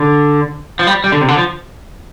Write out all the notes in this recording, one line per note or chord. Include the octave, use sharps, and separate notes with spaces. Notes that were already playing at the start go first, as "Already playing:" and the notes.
Already playing: D3
F3
G3
G3
D3
C3
D3
F3